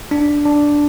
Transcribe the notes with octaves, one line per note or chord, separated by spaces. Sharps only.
D4
D4